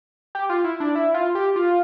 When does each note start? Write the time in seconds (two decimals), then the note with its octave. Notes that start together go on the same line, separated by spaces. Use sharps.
0.35 G4
0.49 F4
0.64 E4
0.80 D4
0.95 E4
1.14 F4
1.35 G4
1.56 F4